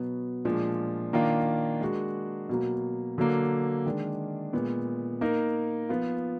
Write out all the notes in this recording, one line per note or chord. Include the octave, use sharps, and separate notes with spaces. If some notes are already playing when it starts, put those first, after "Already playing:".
Already playing: B2 F#3 B3
A#2 F3 G#3 D4
D#3 A#3 D4 F4 A#4
G#3 D4 F#4 A#4
B2 F#3 A#3
D3 F#3 A#3
D#3 G#3 D4
A#2 G#3 B3
A#3 D#4 A#4
F3 B3 F4